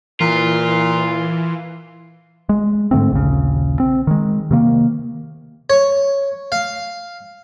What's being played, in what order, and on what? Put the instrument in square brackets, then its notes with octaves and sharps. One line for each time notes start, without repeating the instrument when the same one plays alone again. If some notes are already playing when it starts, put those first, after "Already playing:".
[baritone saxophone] A#2 [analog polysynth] E3 [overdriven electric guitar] F4
[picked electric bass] G#3
G#2 D3 A3 C4
A#1 D#2 C#3
C4
D#3 G#3
C3 D#3 A#3
[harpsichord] C#5
F5